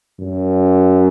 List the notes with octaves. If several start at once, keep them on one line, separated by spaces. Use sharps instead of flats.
F#2